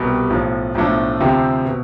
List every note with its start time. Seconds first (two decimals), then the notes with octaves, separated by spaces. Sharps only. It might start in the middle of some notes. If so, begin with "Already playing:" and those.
Already playing: C2 B2 G3
0.30 B1 A2 F3
0.75 B1 A2 F3 A3 D4
1.20 D2 C3 F3 C4 G4
1.65 B2